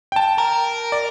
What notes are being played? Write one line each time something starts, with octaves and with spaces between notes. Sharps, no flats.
G5 A5
A#4
D5